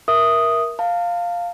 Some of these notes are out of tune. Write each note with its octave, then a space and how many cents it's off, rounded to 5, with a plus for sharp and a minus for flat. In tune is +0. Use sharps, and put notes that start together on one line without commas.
A#4 +15 E5 +0 D#6 +0
F5 +0 A5 +40